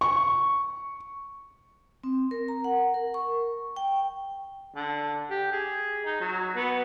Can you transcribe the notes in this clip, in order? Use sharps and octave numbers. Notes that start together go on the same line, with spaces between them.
C#6
C4
A#4
A#5
F#5
A#4
C#6
G5
D3
G4
G#4
D#4
F#3
B3